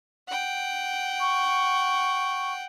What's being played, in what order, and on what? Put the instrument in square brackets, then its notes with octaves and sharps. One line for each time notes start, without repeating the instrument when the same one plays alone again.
[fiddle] F#5 G5
[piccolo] C#6